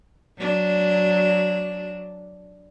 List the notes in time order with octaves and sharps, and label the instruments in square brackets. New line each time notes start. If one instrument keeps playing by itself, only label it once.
[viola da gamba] F#3 D4